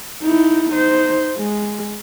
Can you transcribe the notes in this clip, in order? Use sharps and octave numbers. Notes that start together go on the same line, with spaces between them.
D#4 E4
D#4 C5
G#3